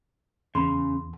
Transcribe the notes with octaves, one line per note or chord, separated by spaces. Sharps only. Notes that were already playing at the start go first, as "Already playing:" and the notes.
E2 C#3 B5 C6